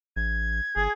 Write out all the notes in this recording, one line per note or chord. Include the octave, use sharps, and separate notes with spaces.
A1 G#6
G1 G#4